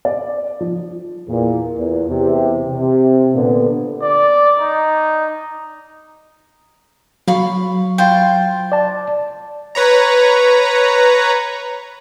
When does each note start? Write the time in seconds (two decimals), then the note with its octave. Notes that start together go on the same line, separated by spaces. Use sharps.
0.05 D5
0.60 F3
1.28 E2 A#2
1.77 E2
2.08 E2 C3
2.66 C3
3.34 A#2 D3 B3
4.02 D5
4.59 D#4
7.28 F#3 F5 B5 C#6
7.98 F4 C5 G5
8.72 D5 A5
9.75 B4 C#5 A#5